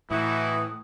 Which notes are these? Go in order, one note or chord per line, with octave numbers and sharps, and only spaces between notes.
A2 E3 D#4 E4 F#4 D#6